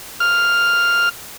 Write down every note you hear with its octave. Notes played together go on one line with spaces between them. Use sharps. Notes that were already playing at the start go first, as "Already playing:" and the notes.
F6